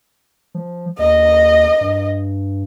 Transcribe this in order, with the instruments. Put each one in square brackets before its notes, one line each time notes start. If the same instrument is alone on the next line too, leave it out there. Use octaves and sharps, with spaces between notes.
[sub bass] F3
[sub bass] D#2 [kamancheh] D#5
[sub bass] G2